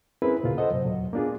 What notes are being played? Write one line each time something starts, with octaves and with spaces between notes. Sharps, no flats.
C4 C#4 E4 G#4 A#4 B4
D#2 A#2 C#3 F4
A4 C5 D#5 F#5
F#2 C3 F#3
D#2 A#2 F#3
A#3 B3 D4 F4 G#4